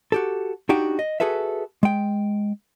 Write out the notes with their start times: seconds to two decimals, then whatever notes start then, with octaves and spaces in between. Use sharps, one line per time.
0.12 F#4 G4 A4
0.69 D4 D#4 F#4 G4 G5
0.99 D#5
1.20 F#4 G#4 A4 B4 E5
1.83 G#3 G5